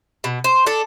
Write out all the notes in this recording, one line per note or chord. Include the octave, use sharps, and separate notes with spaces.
B2
C5
D4 A4